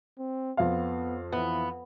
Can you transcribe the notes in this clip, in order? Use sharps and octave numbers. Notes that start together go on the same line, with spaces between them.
C4
F2 B3 F4 F5
E3 B3